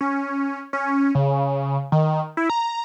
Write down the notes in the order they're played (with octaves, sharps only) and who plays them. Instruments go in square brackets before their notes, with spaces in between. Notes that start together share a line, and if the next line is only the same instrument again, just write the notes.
[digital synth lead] C#4
C#4
C#3
D#3
E4
A#5